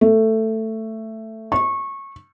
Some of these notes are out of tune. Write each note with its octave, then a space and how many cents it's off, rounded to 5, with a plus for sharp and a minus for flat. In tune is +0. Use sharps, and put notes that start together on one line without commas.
A3 +10
C#6 -20